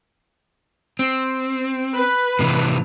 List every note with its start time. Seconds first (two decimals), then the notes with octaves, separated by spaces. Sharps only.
0.99 C4
1.95 B4
2.39 A2 C3 E3